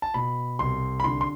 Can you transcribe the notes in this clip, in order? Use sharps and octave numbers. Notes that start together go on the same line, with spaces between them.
A5
B2 B5
C2 C6
B5
D3 C6
C6